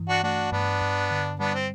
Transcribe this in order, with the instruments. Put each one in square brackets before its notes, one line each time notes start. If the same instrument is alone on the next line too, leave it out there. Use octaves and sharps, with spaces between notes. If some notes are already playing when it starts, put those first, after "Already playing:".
Already playing: [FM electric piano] G2 E3
[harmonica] D4 F#4
[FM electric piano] A3 [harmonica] D4 F#4
[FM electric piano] G2 [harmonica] B3 D4
[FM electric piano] G2
D3
[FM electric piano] G3 [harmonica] B3 D4
[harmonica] C4